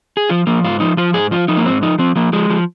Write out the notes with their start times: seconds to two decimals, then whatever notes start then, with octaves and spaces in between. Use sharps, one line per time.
0.17 G#4
0.29 F3 F4
0.47 F3 A#3
0.64 G#2 F4
0.80 F3 D#4
0.97 F3 F4
1.14 G#2 G#4
1.31 F3 F4
1.48 F3 D#4
1.57 A#3
1.65 G#2 C4
1.82 F3 D#4
1.99 F3 C4
2.16 F3 A#3
2.33 F3 G#3
2.50 F3